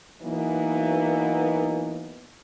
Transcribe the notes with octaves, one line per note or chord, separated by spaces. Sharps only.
E3 F#3 A#3 B3 D#4